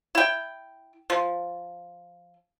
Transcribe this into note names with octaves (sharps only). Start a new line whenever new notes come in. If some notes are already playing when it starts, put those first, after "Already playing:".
E4 G5
F3